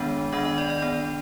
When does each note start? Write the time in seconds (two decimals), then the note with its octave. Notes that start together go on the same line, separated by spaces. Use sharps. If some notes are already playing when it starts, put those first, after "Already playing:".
Already playing: D#3 G#3 B3 D4
0.33 D#3 B3 D4 D#5
0.45 D#5
0.58 D5
0.70 D5
0.82 D#3 B3 D4 D5